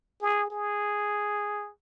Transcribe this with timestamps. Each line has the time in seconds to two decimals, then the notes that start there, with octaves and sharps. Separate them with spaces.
0.22 G#4
0.50 G#4